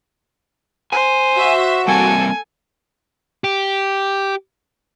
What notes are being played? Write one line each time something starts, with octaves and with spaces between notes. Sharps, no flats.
C5 G#5
F#4 E5
G3 A#3 C4 A4 G#5
G4